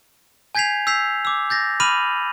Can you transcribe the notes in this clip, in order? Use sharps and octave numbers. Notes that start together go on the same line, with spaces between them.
G#5 G6 G#6 B6 C7 F7
E6 G6 B6 C7 F7
D6 E6
G6 A6 A#6
B5 D6 F6 D#7 F7 F#7